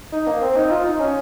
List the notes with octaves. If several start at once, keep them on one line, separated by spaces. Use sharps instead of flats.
D#4
A#3
C4
D#4
F4
D#4
C#4